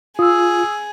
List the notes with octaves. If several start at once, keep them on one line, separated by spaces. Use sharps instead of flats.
F4 G#4 D#6 E6